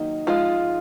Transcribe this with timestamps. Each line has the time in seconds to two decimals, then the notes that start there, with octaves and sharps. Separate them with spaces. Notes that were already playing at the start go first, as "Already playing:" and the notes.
Already playing: D#3 F#3 A#3 D#4
0.27 F3 G#3 F4